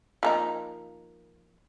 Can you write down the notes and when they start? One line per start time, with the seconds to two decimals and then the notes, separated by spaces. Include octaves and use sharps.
0.23 F3 A#3 D#4